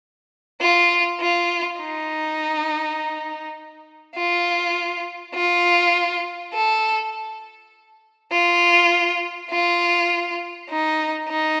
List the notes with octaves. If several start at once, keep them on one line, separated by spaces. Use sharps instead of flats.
F4
F4
D#4
F4
F4
A4
F4
F4
D#4
D#4